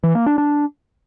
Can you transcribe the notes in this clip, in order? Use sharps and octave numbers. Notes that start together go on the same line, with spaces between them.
E3
A#3
D4
D4